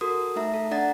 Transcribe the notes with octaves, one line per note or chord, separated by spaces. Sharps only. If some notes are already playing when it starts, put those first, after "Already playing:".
F#4 A4 A#4 D#6
A3 D#4 E5 A#5
A4
D4 D5 F#5 A#5 A6